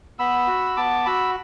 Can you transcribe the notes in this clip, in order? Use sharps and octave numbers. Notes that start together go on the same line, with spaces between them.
B3 B5 E6
F#4
B3 A5 D6
F#4 B5 E6